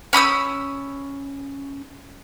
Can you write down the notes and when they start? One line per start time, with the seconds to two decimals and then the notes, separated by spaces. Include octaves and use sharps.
0.13 C#4 B5 D#6 E6